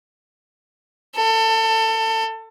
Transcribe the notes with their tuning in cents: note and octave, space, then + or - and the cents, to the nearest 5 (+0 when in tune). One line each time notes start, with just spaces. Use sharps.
A4 +25